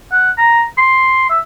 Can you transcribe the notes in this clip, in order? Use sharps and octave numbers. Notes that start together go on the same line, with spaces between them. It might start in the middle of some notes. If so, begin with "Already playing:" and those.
F#5
A#5
C6
E5